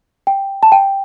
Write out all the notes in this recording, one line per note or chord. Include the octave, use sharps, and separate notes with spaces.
G5
A5
G5